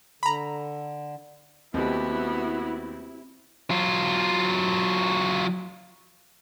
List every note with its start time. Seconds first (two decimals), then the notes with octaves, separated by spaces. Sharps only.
0.23 D3 A#5 B5
1.74 D#2 A3 B3 C4 E4 F#4 G4
3.70 F#3 F4